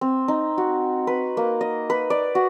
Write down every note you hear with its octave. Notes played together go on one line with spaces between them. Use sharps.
C4
D#4
F#4
B4
A#3
D#5
B4
D5
F#4